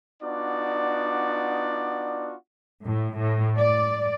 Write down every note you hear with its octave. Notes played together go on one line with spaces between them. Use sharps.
B3 D4 D#4 F4 F#4 D5
A2
A2
D5